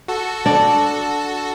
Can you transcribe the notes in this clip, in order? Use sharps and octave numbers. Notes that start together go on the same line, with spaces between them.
F#4 A4
D4